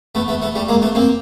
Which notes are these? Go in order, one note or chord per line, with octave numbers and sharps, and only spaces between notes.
A3 B3
A3 B3
A3 B3
G3 A3
G#3 A#3
A3 B3
A#3 C4